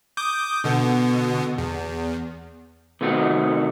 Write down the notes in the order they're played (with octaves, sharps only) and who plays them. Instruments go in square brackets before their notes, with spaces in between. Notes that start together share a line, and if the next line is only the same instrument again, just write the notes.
[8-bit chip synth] D6 D#6 G6
B2 D3 B3
E2
[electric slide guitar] C3 D#3 A3 F#4